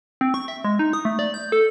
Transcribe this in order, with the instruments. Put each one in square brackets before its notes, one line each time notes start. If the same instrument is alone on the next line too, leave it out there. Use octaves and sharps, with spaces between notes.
[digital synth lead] C4
C#6
E5
G#3
D#4
D#6
A3
D5
G6
A4